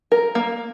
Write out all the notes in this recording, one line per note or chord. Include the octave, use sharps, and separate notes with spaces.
A#4
A#3